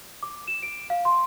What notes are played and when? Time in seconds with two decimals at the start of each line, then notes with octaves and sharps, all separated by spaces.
0.23 D6
0.48 E7
0.62 D7
0.90 F5
1.05 C6